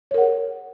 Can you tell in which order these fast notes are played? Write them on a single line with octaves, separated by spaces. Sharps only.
C#5 A#4 F#5 G#4